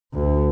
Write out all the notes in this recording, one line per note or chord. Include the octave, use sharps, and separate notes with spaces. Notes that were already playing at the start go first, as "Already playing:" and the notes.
D2